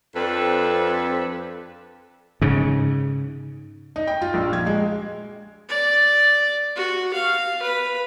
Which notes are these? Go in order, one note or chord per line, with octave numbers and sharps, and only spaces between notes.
F2 C4 D4 A4 B4
G#2 C#3
D#4
G5
F4
A#1
G#6
G#3
D5
F#4
F5
B4